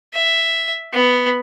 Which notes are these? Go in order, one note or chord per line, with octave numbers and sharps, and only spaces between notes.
E5
B3